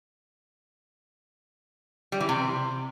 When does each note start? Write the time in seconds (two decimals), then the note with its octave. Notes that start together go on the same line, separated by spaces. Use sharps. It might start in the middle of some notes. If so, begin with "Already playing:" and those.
2.12 G3
2.20 E3
2.29 C3